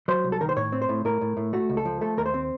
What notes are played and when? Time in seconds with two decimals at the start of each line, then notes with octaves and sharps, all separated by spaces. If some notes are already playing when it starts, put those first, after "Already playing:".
0.08 F#3 C5
0.24 C2
0.32 A4
0.41 D#3 A#4
0.49 C5
0.56 A2 C#5
0.72 C4
0.82 C5
0.89 A2
1.05 A2 A#4
1.21 A2
1.37 A2
1.53 A3 F#4
1.70 C#2
1.77 A4
1.85 F3
2.01 A3 A4
2.17 D#2 A#4
2.26 C5
2.34 C4